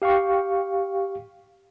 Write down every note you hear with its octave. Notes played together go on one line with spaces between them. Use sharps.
G4 F5 G5 C#6